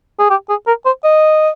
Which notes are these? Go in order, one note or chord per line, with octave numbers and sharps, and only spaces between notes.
G#4
G4
G#4
A#4
C5
D#5